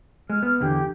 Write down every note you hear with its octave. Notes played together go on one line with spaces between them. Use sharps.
G#3 F6
B3
E2 D3 G4